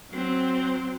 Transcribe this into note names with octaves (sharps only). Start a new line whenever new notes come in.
F#3 C4